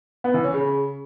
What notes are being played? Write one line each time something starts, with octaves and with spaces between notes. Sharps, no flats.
B3
E3
C#4
C#3